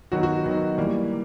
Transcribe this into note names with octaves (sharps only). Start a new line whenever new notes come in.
D#3 F#3 B3 F#4
F#4
D#3 F#3 B3
E3 G3 A#3